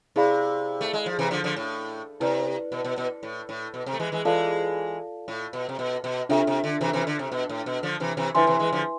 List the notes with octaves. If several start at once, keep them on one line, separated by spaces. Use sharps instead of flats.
C3 E4 G#4 D5 F5 B5
A3
G#3
F3
C3 E3
D3 F3
D3 F3
A2
C3 E4 B4 D5
B2
B2
B2
A2
A2
B2
C3
A3
E3 G#3
E3 G#3
E3 G#3 F4 A4 D5 F5 A5
A2
B2
C3
B2
B2
C3 D4 F4 A4 E5
C3
D3
C3 E3
C3 E3
D3
C3
B2
A2
B2
D3 F3
C3 E3
C3 E3
D3 F3 E4 B4 E5 G#5 C6
C3 E3
E3 G#3
D3 F3